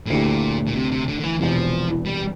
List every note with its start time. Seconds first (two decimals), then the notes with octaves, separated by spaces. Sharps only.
0.06 A2
0.10 D2 A#2 D3 A3 E4 G4
0.67 A#2
0.75 C3
0.91 C3
1.08 D3
1.20 D3
1.24 E3
1.41 E1 E2 C3 E3 F3
2.06 G3